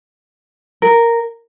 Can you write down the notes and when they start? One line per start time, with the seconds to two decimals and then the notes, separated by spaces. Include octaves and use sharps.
0.82 A#4